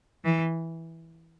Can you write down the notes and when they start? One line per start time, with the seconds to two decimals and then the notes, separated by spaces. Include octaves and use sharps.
0.25 E3